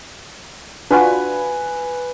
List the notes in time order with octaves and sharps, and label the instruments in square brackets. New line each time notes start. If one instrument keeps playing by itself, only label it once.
[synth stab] D4 F4 F#4 [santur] B4 G#5